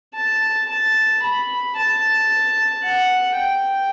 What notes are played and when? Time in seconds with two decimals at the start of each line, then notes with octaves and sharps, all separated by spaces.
0.15 A5
0.69 A5
1.22 B5
1.76 A5
2.84 F#5
3.38 G5